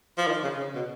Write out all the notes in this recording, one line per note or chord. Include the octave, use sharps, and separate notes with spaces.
F3
D#3
C#3
C#3
B2